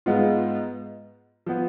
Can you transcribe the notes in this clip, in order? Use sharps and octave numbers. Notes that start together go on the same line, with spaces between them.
G#2 G#3 B3 F4
F3 B3